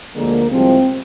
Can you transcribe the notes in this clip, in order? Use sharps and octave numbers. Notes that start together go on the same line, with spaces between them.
D2 D3 F3 G#3 A#3
C2 C3 F3 G#3 C4